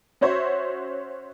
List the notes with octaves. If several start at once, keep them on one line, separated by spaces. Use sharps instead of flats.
C#4 F#4 C5 C#5 E5